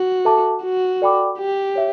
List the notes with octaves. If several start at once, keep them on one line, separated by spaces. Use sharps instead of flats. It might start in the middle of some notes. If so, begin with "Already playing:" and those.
Already playing: F#4
A4 E5 A5 D6
F#4
A4 D5 G5 B5 D6
G4
C#5 E5